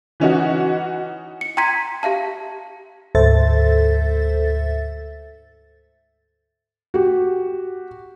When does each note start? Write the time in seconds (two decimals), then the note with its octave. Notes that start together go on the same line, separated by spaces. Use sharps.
0.20 E3 C#4 D#4 F#4
1.41 C#7
1.57 G5 A#5 C6 G#6 B6 D#7
2.03 G4 E5 F5 A5
3.15 D2 G#2 A4 C5 E5 A6
6.94 F#4 G4